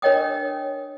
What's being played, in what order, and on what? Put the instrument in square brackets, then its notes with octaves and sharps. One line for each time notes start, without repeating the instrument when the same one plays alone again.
[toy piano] D4 A#4 C#5 D#5 G5 D#6